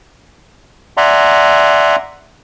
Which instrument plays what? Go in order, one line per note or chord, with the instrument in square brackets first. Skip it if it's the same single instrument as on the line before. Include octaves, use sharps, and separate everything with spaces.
[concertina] D5 E5 F#5 G#5 A#5 C6